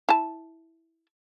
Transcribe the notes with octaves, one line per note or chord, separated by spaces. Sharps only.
E4 A5